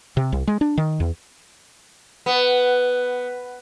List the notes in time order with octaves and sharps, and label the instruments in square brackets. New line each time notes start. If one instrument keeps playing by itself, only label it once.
[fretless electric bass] C3
C2
G#3
D4
D#3
E2
[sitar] B3